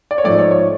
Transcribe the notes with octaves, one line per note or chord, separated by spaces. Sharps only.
D5
C#5
G#2 F3 A3 D5
C#5
C#5